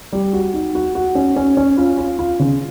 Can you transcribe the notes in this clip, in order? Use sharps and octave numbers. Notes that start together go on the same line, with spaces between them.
G3
F#4
D#4
F#4
F#4
C#4
C#4
C#4
F4
F4
F4
C#3